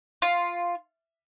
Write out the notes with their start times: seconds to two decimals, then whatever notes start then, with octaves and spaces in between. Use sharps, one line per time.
0.22 F4